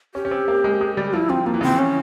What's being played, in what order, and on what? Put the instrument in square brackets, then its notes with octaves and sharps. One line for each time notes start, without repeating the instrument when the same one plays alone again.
[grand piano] C#4 [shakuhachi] G4
[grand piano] C#4
C4
A#3
G#3
G#3
G3
[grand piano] F3 [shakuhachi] E4
[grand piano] F3 [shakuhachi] C4
[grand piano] F3 [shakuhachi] A#3
[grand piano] E3
[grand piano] C#3 [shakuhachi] C4
[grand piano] E3
[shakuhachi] C#4